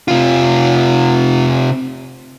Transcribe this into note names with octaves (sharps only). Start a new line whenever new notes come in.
C3 F4